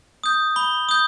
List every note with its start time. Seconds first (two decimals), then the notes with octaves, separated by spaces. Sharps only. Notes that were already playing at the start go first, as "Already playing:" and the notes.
0.24 D#6 G6
0.56 B5 G7
0.89 D#6 G6